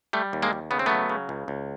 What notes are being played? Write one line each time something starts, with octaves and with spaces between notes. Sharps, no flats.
G3 A3
D#2
G#3 A#3
D#2
C#3 B3
C4
F#3 A3 B3
C#3
C#2
C#2